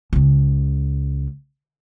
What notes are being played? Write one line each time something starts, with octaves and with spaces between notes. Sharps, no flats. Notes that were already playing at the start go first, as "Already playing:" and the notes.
C#2 C#3